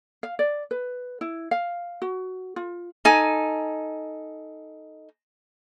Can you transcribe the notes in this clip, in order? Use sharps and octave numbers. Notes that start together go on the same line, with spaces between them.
F5
D5
B4
E4
F5
F#4
F4
D#4 A4 G#5